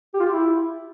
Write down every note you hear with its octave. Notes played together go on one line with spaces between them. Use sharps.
G4
F4
G4
E4